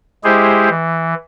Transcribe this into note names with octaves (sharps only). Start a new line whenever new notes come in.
G#3 E4 G4 G#4 C5
E3